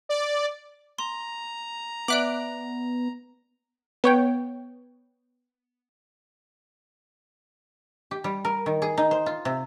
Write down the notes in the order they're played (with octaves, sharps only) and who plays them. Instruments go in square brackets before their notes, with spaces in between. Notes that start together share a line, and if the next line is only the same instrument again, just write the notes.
[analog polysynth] D5
[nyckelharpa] A#5 [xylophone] C6
[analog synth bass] B3 [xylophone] D5 E5 F#7 [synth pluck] D6 F#6 D7
[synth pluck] B3 C#5 G5
[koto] G4
G3
A#4
D#3
G#4
D#4
C5
F4
C3